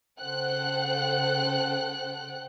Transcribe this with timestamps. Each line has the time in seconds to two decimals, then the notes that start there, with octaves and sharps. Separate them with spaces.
0.20 C#3 A4 C5 F#5 G5 F#6